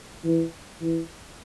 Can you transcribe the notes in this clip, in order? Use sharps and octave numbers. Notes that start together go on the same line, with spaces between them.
E3
E3